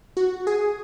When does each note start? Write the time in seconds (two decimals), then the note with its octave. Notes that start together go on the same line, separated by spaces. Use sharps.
0.17 F#4
0.47 G#4